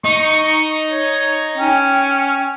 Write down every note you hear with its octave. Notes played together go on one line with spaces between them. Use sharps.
D#4 C#6
C#5
C#4 G5